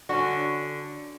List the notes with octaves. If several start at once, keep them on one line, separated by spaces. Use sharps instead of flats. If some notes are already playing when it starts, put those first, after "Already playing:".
D3 C#4 F#4